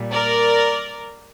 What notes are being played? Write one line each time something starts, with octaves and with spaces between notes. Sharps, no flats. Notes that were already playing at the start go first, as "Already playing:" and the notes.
Already playing: A#2 G3
A#4 D5